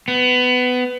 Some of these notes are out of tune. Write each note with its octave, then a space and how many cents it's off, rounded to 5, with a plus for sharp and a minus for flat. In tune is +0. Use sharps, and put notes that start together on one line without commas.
B3 +20